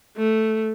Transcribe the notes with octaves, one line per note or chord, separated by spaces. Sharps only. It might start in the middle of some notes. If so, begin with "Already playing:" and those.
A3